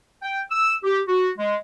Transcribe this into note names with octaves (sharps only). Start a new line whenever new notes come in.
G5
E6
G4
F#4
G#3